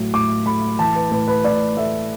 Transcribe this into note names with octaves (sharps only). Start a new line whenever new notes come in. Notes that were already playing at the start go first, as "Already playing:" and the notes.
Already playing: A2 F#3
A2 D6
A3 B5
E3 A5
B4
A2 B4
B4
A2 D5
A3 E5